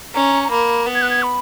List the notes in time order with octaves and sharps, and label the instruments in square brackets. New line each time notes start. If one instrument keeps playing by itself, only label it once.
[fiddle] C#4 [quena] A#5
[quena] A#5
[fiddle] A#3 [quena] B5
[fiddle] B3
[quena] G#6
F#6
G#6
B5